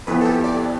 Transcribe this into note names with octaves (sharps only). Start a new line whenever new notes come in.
F2 E3 B3 B4
A4
G4
D5